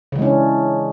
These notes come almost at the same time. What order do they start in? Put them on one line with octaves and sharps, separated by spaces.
C#3 E3 G#3 C#4 D4